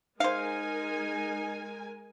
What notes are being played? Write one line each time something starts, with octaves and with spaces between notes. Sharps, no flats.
G#3 D#4 A#4 C5 F5 G#5